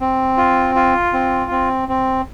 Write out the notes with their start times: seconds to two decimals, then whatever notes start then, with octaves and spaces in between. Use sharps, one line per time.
0.01 C4
0.37 F4
0.75 F4
1.13 C4
1.51 C4
1.89 C4